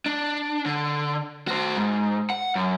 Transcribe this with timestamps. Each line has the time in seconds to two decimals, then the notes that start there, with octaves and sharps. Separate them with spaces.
0.06 D4
0.66 D3
1.48 F#4 C5
1.77 G#2
2.30 F#5
2.55 F#2